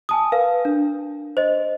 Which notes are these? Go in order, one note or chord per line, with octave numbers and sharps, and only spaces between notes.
G#5 A5 D#6
A#4 B4 F5
D4
C5 D#5